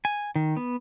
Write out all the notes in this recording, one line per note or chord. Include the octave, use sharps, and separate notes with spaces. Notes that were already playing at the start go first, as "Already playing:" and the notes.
G#5
D#3
B3